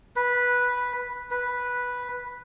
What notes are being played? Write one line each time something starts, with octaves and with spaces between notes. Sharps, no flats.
B4
B4